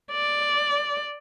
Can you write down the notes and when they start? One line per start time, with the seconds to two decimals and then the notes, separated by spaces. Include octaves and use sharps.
0.12 D5